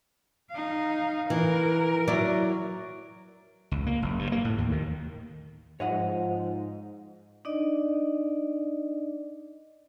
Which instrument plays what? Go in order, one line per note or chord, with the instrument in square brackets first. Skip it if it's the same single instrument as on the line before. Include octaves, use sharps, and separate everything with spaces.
[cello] D#4 F5
[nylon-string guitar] E3 [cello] A#4
[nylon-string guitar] F#3 E4 D5
[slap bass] C#2
A#3
F#1
G2
A#3
A2
D#2
D#3
[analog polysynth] G#2 [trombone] F3 [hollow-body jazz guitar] C#5 D#5 F#5
[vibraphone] D4 D#4 D5 D#5